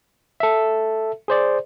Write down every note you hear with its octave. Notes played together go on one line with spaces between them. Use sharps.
A4 E5
G#4 C5 D5